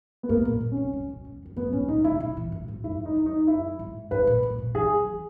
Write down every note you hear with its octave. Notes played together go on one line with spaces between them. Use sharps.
B3
G#2 A#3
A#2
B2
C#4
C#3
B2
A#2
B2
E2
E2
F#2 B3
G#2 C#4
B2 D#4
C#3 E4
B2
E3
G#2
G#2
F#2 E4
F#2
D#4
F#2
D#4
E2
F#2 E4
G#2
G#2 B4
A#2
A#2
B2
E3 G#4
F#3
E3